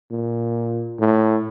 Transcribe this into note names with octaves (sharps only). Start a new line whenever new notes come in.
A#2
A2